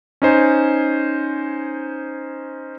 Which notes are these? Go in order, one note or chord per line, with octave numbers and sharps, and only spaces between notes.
C#4 D#4 C5 G#5